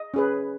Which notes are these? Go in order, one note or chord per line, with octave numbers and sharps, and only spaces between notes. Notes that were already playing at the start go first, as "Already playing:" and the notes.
Already playing: D#5
C#4 G#4 B4